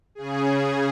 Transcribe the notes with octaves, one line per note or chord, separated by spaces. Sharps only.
C#3 G#4